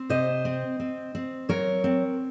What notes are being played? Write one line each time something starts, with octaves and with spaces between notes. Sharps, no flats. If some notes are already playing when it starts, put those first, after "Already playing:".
Already playing: C4
C3 C5 D#5
C4
C4
C4
F#3 A#4 C#5
C4